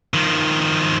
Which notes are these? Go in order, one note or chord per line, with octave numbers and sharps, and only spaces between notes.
D#3 F3